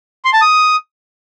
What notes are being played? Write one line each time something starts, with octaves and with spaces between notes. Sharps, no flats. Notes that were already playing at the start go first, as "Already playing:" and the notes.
C6
A5
D#6